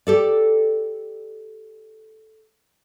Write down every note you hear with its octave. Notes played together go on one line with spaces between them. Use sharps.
G4 A4 D5